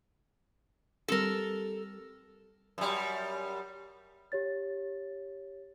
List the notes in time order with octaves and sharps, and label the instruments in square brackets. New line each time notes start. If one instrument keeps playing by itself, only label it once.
[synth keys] G3 C4 G4 [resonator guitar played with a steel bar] A4 A#4
[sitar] F#2 G3
[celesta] G4 C#5 A6